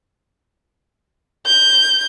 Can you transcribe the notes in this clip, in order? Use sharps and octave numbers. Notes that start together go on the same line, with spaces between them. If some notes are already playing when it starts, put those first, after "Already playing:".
G6